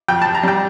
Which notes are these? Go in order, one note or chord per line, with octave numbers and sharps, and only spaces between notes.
F2 G5
A5
F2
A#5
G3 G5